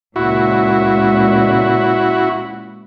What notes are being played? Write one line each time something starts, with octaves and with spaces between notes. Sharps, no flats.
C#2 A#2 E4 F#4